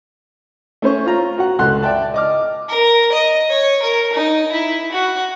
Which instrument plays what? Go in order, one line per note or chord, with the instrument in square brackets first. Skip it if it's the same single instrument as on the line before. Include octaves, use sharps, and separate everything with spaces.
[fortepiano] A3 C#4 C5 C#6
F4 A#5
F#4 F#5
C#2 A4 F#5 C6 F#6
D5 E5 G5 A5
D#5 D6 F6
[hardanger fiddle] A#4
D#5
C#5
A#4
D#4
E4
F#4